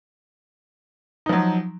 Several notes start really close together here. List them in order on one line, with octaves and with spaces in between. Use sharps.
D#4 F3 F#3